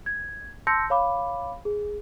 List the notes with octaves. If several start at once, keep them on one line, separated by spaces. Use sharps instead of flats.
G#6
A5 C6 E6 G6 A#6 C#7
C#5 F5 B5 D6
G#4